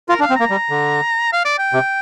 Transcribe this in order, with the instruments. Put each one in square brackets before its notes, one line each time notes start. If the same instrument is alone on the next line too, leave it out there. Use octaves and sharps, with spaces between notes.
[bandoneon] F4 [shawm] A#4
[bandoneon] D4 [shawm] F5
[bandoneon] C4
[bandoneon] A#3 [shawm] A#5
[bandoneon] G3
D3
[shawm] F5
D5
G5
[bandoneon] C3